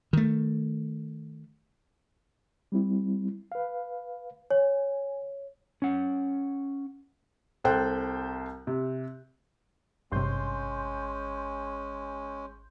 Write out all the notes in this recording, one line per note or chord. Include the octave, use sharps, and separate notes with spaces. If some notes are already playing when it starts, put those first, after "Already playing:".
D#3 A3
G3 C4 E4
B4 F5
C#5 G#5
C#4 F#5
C2 A4 C5 G5 F#6
C3
G#1 G2 C3 G#3 C#4 C6 G6